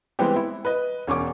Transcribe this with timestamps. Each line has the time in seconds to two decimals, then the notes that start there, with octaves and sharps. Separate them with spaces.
0.19 E3 G3 G#3 B3 C4 G4
0.36 E4
0.65 B4 D#5
1.07 E1 C#4 C#6 D6